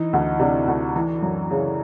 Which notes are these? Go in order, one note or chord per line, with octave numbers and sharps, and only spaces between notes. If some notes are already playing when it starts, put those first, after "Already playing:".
Already playing: E3 D#4
D2
C3 D4
D2
E3
F#2
C#3